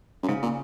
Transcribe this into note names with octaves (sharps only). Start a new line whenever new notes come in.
F#2
G#2 C#3
A#2